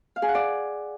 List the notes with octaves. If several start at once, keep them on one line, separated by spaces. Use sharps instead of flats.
F5
G#4
F#5
D5